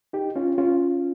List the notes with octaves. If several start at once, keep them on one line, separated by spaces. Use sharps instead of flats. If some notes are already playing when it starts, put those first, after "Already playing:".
D#4 G4
C#4 F4
C#4 F4